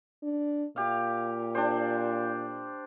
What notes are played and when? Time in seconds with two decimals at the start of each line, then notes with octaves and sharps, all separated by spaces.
0.23 D4
0.76 A#2 G4 F5
1.55 D4 G4 C5